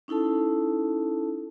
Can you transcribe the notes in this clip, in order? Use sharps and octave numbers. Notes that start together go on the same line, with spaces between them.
C#4 D#4 E4 A4 A5